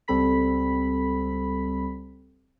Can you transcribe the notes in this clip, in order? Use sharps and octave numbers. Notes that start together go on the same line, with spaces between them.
C#2 G3 C4 A4 B5 B6